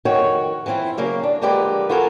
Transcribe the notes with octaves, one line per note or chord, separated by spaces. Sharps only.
F2 D#3 F#4 C#5
E3 F3 C4 E4 F4
C#3 F#3 A#3 F5
D4
D3 F3 G#3 A#3 G4 B4
B3 F4 F#4 A4 A#4 G#5